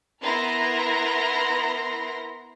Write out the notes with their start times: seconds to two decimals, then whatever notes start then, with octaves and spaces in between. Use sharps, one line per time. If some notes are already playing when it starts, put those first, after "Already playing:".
0.22 B3 E4 A#4 A#5 C6 A#6